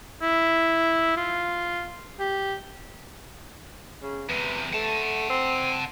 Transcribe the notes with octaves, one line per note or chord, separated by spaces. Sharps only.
E4
F4
G4
C#3
E2 C3 B4
A3 F#5 A5
C4